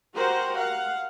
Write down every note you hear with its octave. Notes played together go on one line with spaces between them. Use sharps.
F#4 G4 A#4 C5 F#5
F5 F#5